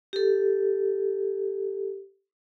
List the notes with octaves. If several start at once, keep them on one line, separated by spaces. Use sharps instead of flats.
G4 A4